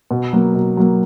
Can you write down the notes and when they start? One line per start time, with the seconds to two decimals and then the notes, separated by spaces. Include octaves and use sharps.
0.11 B2
0.33 F#3 A#3
0.55 B2
0.77 F#3 A#3